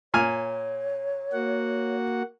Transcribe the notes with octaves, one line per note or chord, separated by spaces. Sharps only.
A#2 C#5 G#5 F6
A#3 F#4 F#5